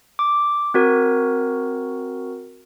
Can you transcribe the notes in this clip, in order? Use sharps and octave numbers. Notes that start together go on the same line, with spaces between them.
D6
C4 F#4 A#4